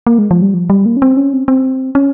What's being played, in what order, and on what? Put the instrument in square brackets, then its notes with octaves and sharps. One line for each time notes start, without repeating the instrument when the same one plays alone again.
[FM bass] A#3
G#3
F3
G3
F3
G3
A#3
C#4
C4
C#4
C4
C4
C#4